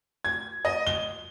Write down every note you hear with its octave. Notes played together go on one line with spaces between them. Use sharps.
G#6
D#5
G7